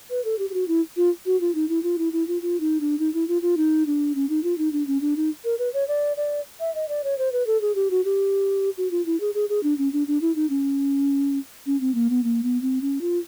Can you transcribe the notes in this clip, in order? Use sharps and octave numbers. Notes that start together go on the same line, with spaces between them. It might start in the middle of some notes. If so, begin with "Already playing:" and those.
B4
A4
G4
G4
F#4
E4
F4
F#4
F4
D#4
E4
F4
E4
E4
F4
F4
D#4
D4
D#4
E4
F4
F4
D#4
D4
C#4
D#4
F4
D#4
D4
C#4
D4
D#4
A#4
B4
C#5
D5
D5
E5
D#5
D5
C#5
C5
B4
A4
G#4
G4
F#4
G4
F#4
F4
E4
G#4
G#4
G#4
D4
C#4
D4
D4
E4
D#4
C#4
C#4
C4
A#3
B3
A#3
B3
C4
C#4
F4